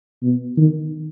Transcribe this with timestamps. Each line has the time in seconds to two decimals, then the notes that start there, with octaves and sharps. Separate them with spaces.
0.23 B2
0.58 D#3